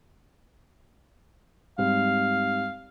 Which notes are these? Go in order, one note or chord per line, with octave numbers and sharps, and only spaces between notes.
G#2 G3 C4 F5